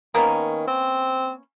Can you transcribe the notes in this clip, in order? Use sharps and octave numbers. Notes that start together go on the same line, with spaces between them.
D#3 A#3 B3 C#4
C4